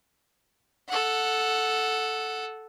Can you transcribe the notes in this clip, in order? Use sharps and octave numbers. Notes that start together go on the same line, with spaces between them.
A4 F#5